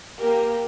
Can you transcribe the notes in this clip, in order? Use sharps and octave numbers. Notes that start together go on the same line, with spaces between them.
A#3 G4 A#4